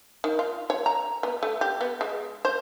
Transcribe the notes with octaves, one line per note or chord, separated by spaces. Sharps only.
D#3
F4
C#5
A#5
B3
A3
G4
B3
G#3
C5